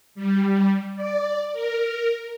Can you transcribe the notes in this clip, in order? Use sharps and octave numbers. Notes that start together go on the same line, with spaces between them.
G3
D5
A#4